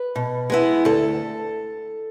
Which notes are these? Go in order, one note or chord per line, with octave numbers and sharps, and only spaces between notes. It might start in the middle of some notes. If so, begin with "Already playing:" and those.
Already playing: B4
B2
G#3 B3 E4
D2 A4